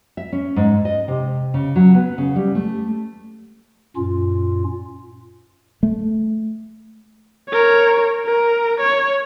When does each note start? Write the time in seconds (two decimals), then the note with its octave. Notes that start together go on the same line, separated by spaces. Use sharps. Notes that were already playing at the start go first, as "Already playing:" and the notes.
0.17 E5
0.32 C#4
0.56 G#2
0.85 D#5
1.08 C3
1.54 C#3
1.76 F#3
1.95 B3
2.18 C#3
2.36 G3
2.55 A3
3.96 F#2 A#2 C#4 F4
5.83 A3
7.49 A#4 C#5
8.26 A#4
8.80 C#5